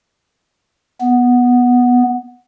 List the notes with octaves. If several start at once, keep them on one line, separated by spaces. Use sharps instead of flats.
B3